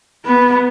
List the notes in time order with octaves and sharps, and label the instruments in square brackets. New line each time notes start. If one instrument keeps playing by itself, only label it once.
[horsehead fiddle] B3